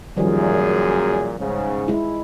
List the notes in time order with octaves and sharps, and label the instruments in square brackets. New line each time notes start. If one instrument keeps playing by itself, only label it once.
[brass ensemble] F#2 A#2 G#4 [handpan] D#3 F3 G3
[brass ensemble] G#2 C#3
[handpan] G#3 E4